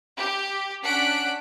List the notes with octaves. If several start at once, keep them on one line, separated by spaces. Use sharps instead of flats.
G4
C#4 D4 F#5 F#6 B6 D7